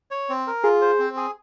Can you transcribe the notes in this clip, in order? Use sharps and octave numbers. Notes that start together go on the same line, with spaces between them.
C#5
C4
A#4
F4 G#4
C5
C4
G#4